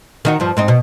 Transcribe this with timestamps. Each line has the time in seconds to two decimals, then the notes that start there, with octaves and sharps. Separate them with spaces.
0.25 D#3 D#4 F#4
0.40 G2 F3
0.57 G#2 C4 D#4
0.68 B2